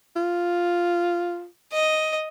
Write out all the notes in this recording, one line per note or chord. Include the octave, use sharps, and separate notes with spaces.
F4
D#5